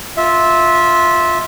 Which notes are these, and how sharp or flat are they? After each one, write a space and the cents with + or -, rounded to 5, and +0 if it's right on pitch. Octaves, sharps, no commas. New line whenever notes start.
F4 +0 E5 -15